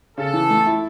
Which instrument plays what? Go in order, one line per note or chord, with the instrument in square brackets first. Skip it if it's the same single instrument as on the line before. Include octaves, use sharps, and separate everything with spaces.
[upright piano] C#3 [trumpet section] A4
[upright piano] E3
A3
E4